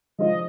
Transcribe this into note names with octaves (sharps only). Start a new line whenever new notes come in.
F3 G#3 D4 F4 C5 D#5